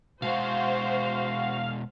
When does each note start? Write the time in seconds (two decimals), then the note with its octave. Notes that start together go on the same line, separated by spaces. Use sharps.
0.22 B2 G#3 F#4 C5 F5 F#5